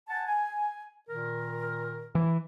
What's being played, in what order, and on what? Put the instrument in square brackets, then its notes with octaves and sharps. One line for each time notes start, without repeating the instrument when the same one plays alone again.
[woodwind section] F#5 G#5 A5
G#5
A#2 D#3 A#4
[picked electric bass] E3